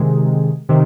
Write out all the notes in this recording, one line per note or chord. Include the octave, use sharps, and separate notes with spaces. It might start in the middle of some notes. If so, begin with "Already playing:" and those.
Already playing: C3 D#3 G#3
C3 D#3